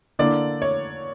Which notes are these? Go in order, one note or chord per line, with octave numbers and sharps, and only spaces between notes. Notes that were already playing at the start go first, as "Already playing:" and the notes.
D3 A#3 E4 D5
C#5